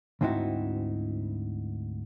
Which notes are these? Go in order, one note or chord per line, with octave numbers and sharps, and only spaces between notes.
D2 G#2 C4 D#4 E4 F#4